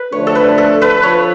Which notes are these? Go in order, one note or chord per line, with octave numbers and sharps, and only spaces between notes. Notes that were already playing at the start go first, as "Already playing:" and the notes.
Already playing: B4
D3 F3 A3 D4 C#5
A4
B4
A4
B4
F3 C#5